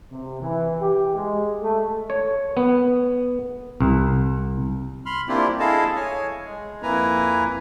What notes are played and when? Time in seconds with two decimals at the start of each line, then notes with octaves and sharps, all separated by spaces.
0.11 C3
0.41 E3
0.80 G4
1.15 G#3
1.61 A3
2.10 C#5
2.57 B3
3.81 C2
5.06 B5 C6 F6
5.28 A#3 C4 D4 E4 F4 G4
5.60 E4 G#4 A4 D#5 F5 A5
5.96 C#5 G#5
6.46 G#3
6.83 F2 A#3 E4 B4 G#5 A#5